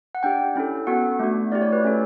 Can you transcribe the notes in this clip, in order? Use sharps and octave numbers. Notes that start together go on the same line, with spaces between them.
F#5
D4 G4 G5
C#4 E4 A4
B3 F#4 A4 F#5
A3 D4 F#4
A3 E4 G4 D5
C#5
B4
A3 C#4 E4 A4